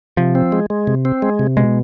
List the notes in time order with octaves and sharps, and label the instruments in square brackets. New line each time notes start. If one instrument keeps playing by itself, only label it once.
[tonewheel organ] C3 [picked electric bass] F3
[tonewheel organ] C4
G#3
G#3
C3
C4
G#3
C3
[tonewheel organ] B2 [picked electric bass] G#3